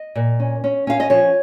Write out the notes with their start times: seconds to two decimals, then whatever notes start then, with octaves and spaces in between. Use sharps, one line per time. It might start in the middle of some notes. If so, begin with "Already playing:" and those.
Already playing: D#5
0.15 A#2
0.40 C#4
0.64 C#4
0.87 C#4 F5
1.00 D#5
1.10 F3 C#5